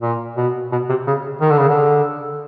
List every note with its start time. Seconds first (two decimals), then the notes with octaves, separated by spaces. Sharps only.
0.02 A#2
0.37 B2
0.72 B2
0.89 C3
1.07 C#3
1.41 D#3
1.50 D3
1.60 C#3
1.69 D3